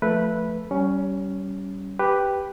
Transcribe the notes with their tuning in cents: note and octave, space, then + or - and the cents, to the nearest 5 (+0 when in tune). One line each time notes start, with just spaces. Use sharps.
F3 +0 A3 +0 B4 -10
G3 -25 C#4 +10
G4 +0 B4 +0